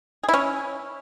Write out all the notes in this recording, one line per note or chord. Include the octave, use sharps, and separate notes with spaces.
G#4
E4
C#4